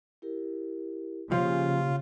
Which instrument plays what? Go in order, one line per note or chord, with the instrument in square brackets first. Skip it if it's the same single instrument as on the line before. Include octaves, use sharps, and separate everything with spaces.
[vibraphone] E4 G4 A#4
[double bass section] C#3 [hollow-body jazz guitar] F3 [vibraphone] A#3 G4 [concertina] F4